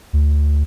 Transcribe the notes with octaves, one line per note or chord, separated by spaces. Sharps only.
D2